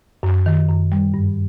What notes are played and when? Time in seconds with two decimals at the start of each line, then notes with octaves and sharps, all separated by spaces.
0.23 F#2
0.46 D#3
0.69 F#2
0.92 G3
1.14 G2